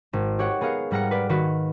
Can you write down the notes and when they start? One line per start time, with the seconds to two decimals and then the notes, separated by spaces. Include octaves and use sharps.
0.13 G#1
0.39 G4 C#5 F#5
0.61 B3 G#4 A#4 F5 C#7
0.91 G#2 G3 F#5 A#5 F6 C#7
1.11 B4 D5
1.29 D#3 F#4 B4